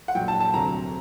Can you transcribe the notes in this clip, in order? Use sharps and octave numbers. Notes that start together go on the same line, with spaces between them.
F#5
A#1 A#2 F#3 G5
A5
A5
D2 C3 F#3 A#5